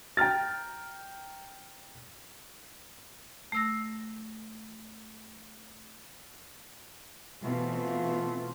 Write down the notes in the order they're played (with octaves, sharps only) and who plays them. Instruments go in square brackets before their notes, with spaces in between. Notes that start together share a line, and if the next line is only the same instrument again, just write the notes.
[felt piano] G5 A#5 F6 A6
[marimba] A3 E6 A#6
[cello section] B2 E3 C4 [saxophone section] A3 B3 F4